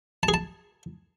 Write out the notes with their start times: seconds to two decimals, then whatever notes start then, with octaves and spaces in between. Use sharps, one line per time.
0.23 A5
0.29 G#4
0.34 A5